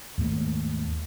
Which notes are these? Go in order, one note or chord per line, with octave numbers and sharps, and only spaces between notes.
D#2 G#2 A3 A#3